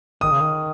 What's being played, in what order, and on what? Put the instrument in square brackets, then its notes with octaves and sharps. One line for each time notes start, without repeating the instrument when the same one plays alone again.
[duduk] D#3 [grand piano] D#6
[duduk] C#3
D#3